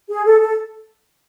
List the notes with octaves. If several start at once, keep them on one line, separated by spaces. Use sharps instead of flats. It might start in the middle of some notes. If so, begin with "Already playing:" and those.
G#4
A4
A4